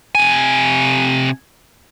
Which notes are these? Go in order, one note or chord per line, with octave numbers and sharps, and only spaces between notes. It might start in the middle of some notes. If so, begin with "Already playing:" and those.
C3 G#5